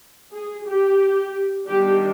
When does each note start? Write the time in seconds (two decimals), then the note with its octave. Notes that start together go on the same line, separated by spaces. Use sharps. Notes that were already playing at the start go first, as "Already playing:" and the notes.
0.32 G#4
0.66 G4
1.67 D#3 G3 B3 D4 G4